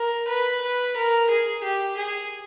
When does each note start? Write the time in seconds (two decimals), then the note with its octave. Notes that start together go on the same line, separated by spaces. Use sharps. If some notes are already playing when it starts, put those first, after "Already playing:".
Already playing: A#4
0.27 B4
0.62 B4
0.96 A#4
1.30 G#4
1.64 G4
1.97 G#4